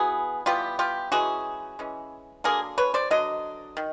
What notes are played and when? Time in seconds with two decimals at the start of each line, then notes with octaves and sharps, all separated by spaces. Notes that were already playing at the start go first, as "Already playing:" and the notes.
Already playing: E3 B3 F#4 G#4
0.46 E3 G3 B3 F4 G4
0.79 F4 G4
1.12 E3 G#3 C#4 F#4 G#4
1.79 E3 G#3 C#4
2.44 D3 F#3 A#3 D4 G#4 A#4
2.78 B4 C#5
2.94 C5 D5
3.10 D3 F#3 D#5
3.77 D#3